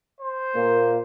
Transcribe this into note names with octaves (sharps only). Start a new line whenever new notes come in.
C5
A#2 A#3